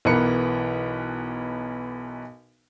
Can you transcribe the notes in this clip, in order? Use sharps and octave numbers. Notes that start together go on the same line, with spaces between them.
B1 E3 B3 A#4 B4 C#7